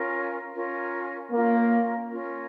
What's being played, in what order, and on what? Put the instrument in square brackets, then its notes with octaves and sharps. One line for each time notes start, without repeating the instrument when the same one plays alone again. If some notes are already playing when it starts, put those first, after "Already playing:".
Already playing: [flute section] C#4 F4 A#4
C#4 F4 A#4
[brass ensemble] A#3 [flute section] C#4 F4 A#4
[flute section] C#4 F4 A#4